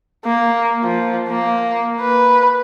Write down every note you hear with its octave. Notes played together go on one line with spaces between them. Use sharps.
A#3
F3
A#3
B4